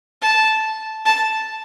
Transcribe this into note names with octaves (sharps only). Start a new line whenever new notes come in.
A5
A5